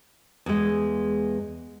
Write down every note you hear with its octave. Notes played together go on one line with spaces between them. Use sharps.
E2 G#3